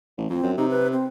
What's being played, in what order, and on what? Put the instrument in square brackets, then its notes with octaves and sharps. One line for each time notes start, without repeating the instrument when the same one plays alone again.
[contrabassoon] A1
[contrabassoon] F2 [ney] C4
[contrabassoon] F#2
[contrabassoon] C3 [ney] D#4
[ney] B4
C4